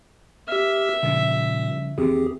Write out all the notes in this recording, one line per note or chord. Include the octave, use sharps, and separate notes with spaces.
G4 E5 F6
A#2 C#3 F3 G3
E2 D#3 C4 G4 G#4